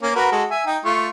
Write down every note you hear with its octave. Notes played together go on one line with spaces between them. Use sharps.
A#3 C#4
F#4 A#4 B4
G#3 F#4 A4
E5 G#5
D#4 G5
A3 F4 C#6